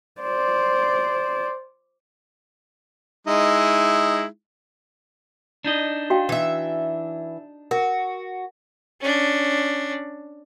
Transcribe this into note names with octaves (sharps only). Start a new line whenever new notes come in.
C5 D5
G#3 D#4 E4
D4 D#4 D#5
F#4 F5 G5
E3 E5
F#4 A#4
C#4 D4